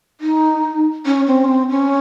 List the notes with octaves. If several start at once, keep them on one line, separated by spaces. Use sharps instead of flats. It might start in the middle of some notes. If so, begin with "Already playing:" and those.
D#4
C#4
C4
C#4
C4
C#4